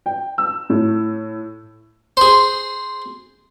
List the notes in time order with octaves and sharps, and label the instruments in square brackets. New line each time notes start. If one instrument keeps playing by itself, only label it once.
[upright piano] G5
E6
A2
[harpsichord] G#4 C5